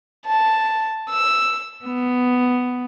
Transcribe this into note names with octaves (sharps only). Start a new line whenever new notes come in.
A5
E6
B3